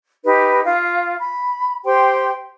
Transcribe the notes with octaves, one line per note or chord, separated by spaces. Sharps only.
D#4 G4 B4
F4 F5
B5
G4 C5 G5 C6